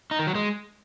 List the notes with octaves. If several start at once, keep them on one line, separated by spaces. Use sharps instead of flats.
D#4
D#3
F#3
G#3